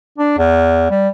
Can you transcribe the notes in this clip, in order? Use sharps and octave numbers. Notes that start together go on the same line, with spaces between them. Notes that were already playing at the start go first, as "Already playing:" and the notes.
D4
E2
G3